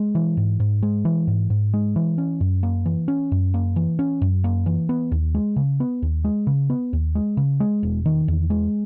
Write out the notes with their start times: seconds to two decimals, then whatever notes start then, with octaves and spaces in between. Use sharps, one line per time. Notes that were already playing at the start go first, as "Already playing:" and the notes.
Already playing: G#3
0.15 E3
0.37 G#2
0.60 G#2
0.83 G#3
1.05 E3
1.27 G#2
1.50 G#2
1.74 G#3
1.96 E3
2.18 C#4
2.41 F#2
2.63 A#3
2.86 E3
3.08 C#4
3.32 F#2
3.54 A#3
3.76 E3
3.99 C#4
4.22 F#2
4.44 A#3
4.66 E3
4.89 B3
5.12 D#2
5.35 G#3
5.56 C#3
5.80 B3
6.02 D#2
6.24 G#3
6.47 C#3
6.70 B3
6.93 D#2
7.15 G#3
7.37 C#3
7.60 G#3
7.83 E1
8.06 D#3
8.28 E2
8.50 G#3